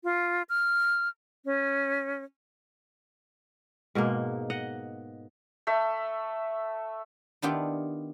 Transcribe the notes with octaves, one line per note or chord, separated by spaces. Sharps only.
F4
F6
C#4
G#2 B2 G#3 A#3
D#5 F#5
A3 E5
D#3 B3 D4 E4 F4 G4